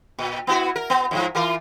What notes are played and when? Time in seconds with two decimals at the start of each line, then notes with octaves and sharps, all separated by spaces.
0.19 A#2
0.47 B3 E4 F#4
0.76 A#4
0.90 B3
1.11 F2 G#2 F3
1.35 E3 F4 A#4